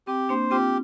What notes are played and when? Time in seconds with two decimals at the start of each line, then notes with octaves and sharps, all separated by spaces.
0.07 C4 G4
0.29 A#3 D4 C5
0.51 C4 F4 G4